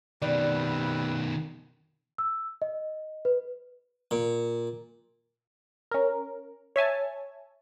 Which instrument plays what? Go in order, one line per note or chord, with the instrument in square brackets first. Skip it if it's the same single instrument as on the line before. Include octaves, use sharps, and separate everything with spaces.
[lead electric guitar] B2 D#3 [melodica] G3 C4 B4 [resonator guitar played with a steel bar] D5
[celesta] E6
D#5
B4
[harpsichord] A#2
[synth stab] C#4 A#4
C#5 E5 G#5 A5